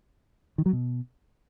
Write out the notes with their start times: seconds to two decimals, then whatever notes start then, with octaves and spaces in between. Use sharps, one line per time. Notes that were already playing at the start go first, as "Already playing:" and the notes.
0.58 D#3
0.66 F#3
0.73 B2